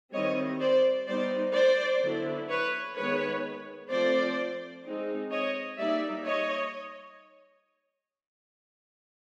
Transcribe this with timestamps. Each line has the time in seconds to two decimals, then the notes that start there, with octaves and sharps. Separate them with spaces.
0.12 D#3 G3 C4 E4 C#5 D#5
0.60 C5 D5
1.06 G3 B3 D#4 C5 D5
1.54 C5 D5
2.01 D3 F#3 B3 E4
2.48 B4 C#5
2.95 D#3 G#3 B3 B4 C#5
3.90 F3 A3 C4 F4 C5 D5
4.84 G#3 C4 D#4
5.31 C#5 D#5
5.78 G3 A#3 D#4 D5 E5
6.25 C#5 D#5